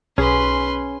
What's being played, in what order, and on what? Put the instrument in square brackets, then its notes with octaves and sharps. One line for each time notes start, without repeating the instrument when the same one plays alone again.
[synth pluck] B1 [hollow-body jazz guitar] C#4 G#4 [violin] B4 C6